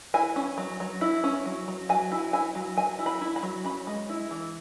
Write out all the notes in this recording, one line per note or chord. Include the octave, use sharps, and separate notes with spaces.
E4 G#5
C#4
F#3
F#3
E4
C#4
F#3
F#3
F#3 G#5
E4
E4 G#5
F#3
F#3 G#5
E4
B5
E4
B5
F#3
C#4 B5
G#3
E4
E3